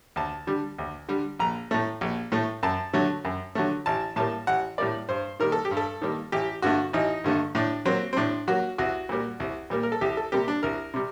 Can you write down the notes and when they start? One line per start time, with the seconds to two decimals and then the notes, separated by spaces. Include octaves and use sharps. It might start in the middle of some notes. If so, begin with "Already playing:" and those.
0.16 D2 A5
0.47 D3 G3
0.78 D2
1.09 D3 G3
1.39 A#1 A#5
1.71 A2 A3
2.01 A#1
2.32 A2 A3
2.63 F#2 A5
2.93 D3 F#3 A3
3.25 F#2
3.55 D3 F#3 A3
3.86 A1 A5
4.16 A2 G3 A#3 A5
4.47 A1 F#5
4.78 A2 G3 A#3 D5
5.09 G2 C5
5.40 D#3 G3 A#3 A#4
5.52 A4
5.65 G4
5.71 G2
5.77 A4
6.02 D#3 G3 A#3
6.32 A1 G4
6.62 G2 D3 A3 F#4
6.93 A1 D#4
7.24 G2 D3 A3
7.55 A2 D4
7.85 F#3 A#3 C4
8.13 C4
8.17 A2 D4
8.48 F#3 A#3 F#4
8.78 C2 F#4
9.09 A#2 G3 A#3
9.40 C2
9.70 A#2 G3 A#3
9.83 A#4
9.92 A4
10.01 C2 G4
10.17 A4
10.32 C3 G3 A#3 G4
10.48 D4
10.63 C2 A#4
10.94 C3 G3